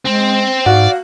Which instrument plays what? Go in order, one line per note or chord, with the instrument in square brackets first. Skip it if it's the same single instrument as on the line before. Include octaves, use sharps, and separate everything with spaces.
[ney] G#3 [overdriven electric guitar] C4
[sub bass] G#2 [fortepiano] F#4 [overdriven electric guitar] D5 [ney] F5